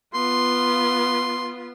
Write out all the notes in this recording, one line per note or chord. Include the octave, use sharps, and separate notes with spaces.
B3 F4 C6